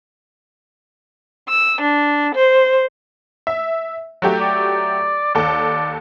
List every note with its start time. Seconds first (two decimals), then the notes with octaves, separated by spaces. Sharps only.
1.48 E6
1.81 D4
2.34 C5
3.47 E5
4.22 F#3 A3 G4
4.41 D5
5.35 D#2 A4 D5